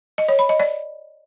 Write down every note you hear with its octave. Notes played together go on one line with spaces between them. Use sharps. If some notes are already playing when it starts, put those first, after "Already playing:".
D#5
C#5
B5
D#5
D5